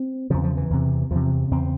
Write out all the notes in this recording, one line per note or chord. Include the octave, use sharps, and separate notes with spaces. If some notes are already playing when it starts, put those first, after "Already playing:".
Already playing: C4
E2 C#3 F3
F3
E3
E2 C3
E2 C3 F3
E2 C#3 C4